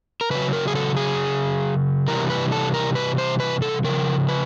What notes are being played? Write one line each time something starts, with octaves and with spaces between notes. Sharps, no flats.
A#4
C#3 F#3 B4
A#4
G#4
A4
G#4
C3 E3 G3 A#4
B4
A4
A#4
B4
C5
B4
A4
C#3 F3 A#4
B4